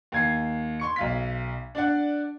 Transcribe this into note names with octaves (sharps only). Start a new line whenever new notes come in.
D#2 G#6 C7
C6 C#6 C#7
B1 F5 B6
D4 D5 F#5